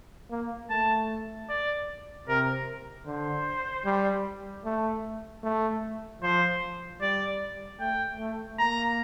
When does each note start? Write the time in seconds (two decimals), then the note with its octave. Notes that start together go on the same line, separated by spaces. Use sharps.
0.31 A#3
0.70 A3 A5
1.49 D5
2.28 C3 A#4
3.06 D3 C5
3.85 G3
4.65 A3
5.44 A3
6.22 F3 C5
7.01 G3 D5
7.80 A3 G5
8.19 A3
8.59 A#3 A#5